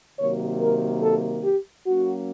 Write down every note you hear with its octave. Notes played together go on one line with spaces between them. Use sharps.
C3 D#3 F#3 A#3 C#5
A#4
A4
G4
F#3 A#3 C#4 F#4